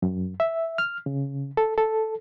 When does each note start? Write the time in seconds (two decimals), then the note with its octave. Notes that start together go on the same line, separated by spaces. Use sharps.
0.02 F#2
0.40 E5
0.78 F6
1.06 C#3
1.57 A4
1.78 A4